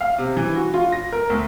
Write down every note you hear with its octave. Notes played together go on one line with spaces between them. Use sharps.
F5
C3
E3
F#4
F4
A#6
A#4
D2